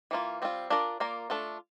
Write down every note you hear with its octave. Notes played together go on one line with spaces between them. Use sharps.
E3 A#3 F4
G3 C4 F4
D4 F4 A#4 D5
A#3 F4 A#4 D5
A3 D4 F4 A4